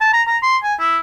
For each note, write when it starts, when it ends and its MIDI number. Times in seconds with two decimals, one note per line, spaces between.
0.01 0.13 81
0.13 0.22 82
0.27 0.37 82
0.43 0.57 84
0.64 0.74 80
0.80 0.98 64